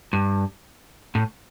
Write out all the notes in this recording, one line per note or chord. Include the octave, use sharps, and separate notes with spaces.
G2
A2